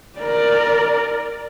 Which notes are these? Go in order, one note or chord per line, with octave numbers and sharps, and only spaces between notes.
A#4 D5